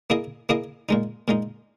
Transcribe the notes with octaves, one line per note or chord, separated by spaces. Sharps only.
A#3 E4 G#4 D#5
A#3 E4 G#4 D#5
A#2 G#3 D#4
A#2 G#3 D#4